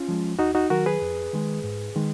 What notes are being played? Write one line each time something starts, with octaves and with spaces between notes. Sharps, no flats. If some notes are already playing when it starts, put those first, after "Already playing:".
Already playing: C#4 F4
F3 G#3
D#2 D#4 F#4
D#4 F#4
D#3 F#3 F#4 A#4
G#4 B4
F2
D#3 G#3
G#2
D#3 G#3